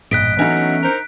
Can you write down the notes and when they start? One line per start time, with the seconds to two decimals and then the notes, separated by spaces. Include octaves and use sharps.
0.11 A1 G2 A#2 D#5 F#6 B6 D7
0.39 E3 F#3 A3 B3 C#4 D#4 A#5
0.82 D#4 A#4 C5